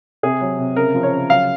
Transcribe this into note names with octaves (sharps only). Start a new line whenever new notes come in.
C3 G#4
F#3
C3
C#3 A#4
F3
C#5
C#3
F#3 F5